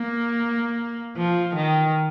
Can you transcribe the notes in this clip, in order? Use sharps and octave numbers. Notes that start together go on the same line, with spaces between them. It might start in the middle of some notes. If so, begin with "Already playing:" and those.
Already playing: A#3
F3
D#3